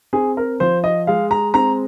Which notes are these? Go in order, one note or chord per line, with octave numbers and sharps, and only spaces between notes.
C4 G#4
A#4
F3 C5
D#5
G#3 F5
A#5
C4 A#5